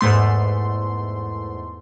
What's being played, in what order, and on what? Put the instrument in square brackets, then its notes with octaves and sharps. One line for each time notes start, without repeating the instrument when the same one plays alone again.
[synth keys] E2 G#2 A3 C6